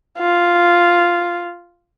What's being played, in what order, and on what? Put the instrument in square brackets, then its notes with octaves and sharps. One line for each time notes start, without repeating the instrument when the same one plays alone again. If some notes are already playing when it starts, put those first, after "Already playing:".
[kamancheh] F4